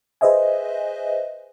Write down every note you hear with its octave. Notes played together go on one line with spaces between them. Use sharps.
G#4 B4 C5 D#5 E5 G#5